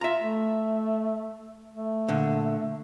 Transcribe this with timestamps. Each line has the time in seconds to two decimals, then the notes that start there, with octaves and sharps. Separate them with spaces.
0.01 F4 E5 A#5
0.22 A3
1.74 A3
2.08 A#2 D3